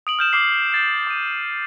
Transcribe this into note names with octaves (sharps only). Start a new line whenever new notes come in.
D#6 D7 F#7
F6 G6 E7
D6 F6 C7
G6 A6 C7
D#6 D#7